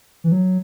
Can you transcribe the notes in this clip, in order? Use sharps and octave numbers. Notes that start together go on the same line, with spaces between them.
E3
F#3